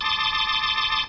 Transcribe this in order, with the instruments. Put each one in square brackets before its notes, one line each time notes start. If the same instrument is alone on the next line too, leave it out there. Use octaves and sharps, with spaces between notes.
[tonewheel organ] A5 C6 D6 D#6 A6